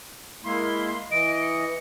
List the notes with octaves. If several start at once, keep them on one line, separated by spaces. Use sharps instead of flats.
G#3 A#3 E4 C6
E3 D#5 D7
C#7